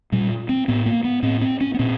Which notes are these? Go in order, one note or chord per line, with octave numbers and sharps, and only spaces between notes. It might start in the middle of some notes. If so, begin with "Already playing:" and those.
A#2 G3
C4
A2 B3
A#3
B3
A2 C4
C4
C#4
B3
A#2 C4